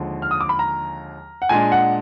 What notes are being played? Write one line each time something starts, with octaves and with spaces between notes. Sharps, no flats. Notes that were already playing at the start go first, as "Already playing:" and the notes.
Already playing: D#2 D3 F3 G#3
F6
D#6
D6
B5
A#5
F#5
A#2 G#3 D4 G#5
F#5